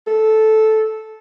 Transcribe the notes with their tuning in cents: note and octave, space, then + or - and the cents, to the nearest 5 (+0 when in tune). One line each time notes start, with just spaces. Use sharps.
A4 -10